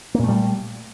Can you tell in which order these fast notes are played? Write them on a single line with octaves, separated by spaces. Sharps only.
A#3 A#2 A3 G3